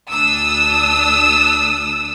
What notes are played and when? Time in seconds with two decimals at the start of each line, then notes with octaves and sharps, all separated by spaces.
0.11 D2 D4 D#6 E6